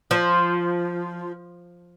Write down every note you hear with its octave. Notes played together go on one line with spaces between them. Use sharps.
F3